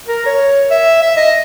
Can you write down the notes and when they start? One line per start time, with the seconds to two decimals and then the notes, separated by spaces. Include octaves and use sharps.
0.08 A#4
0.26 C#5
0.71 E5
1.02 E5
1.17 D#5